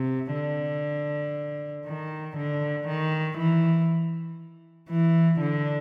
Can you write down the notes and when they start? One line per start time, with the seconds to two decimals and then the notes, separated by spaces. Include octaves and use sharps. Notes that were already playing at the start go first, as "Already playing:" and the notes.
Already playing: C3
0.34 D3
1.86 D#3
2.37 D3
2.88 D#3
3.38 E3
4.89 E3
5.40 D3